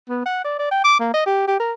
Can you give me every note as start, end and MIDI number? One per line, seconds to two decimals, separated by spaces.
0.09 0.21 59
0.25 0.40 78
0.44 0.57 74
0.59 0.71 74
0.71 0.82 79
0.84 0.98 86
1.00 1.10 58
1.14 1.25 75
1.26 1.45 67
1.48 1.57 67
1.60 1.73 70